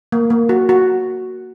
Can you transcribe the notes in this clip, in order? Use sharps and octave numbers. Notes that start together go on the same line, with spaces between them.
A#3
A#3
F#4
F#4